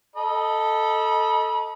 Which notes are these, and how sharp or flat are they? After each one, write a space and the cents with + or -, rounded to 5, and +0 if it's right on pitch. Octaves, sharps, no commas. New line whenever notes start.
A4 +0 D#5 +0 B5 -35